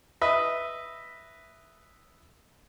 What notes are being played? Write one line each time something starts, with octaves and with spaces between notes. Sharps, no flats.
B4 D#5 E5